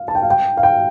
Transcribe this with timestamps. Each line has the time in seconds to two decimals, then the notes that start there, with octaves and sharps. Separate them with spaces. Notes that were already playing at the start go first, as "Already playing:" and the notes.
Already playing: F5
0.08 A5
0.15 G5
0.23 F5
0.30 G5
0.57 F5
0.63 G5